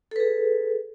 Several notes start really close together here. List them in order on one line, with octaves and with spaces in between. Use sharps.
A4 B4 G#4